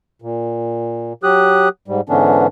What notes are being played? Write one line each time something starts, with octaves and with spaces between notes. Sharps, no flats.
A#2
F#3 G4 D#6 F#6
G#2 G3
G#2 D3 E3 B3 C#4 D4